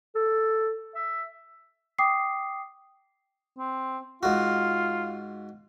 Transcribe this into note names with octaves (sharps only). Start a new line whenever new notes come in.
A4
E5
G5 D6 D#6 C7
C4
G#2 F4 F#4